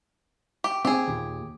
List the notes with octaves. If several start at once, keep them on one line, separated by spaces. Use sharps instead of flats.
G4
C4 D4 G4 G#4
D#2 A#2